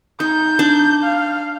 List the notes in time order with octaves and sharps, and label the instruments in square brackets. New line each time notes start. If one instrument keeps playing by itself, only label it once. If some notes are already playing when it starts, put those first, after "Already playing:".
[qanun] D#4 [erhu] G6
[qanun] D4
[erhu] F5